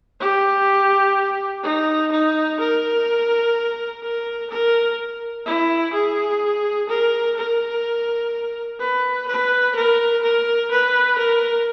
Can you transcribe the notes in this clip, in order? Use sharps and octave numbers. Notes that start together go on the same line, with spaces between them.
G4
D#4
D#4
A#4
A#4
A#4
E4
G#4
A#4
A#4
B4
B4
A#4
A#4
B4
A#4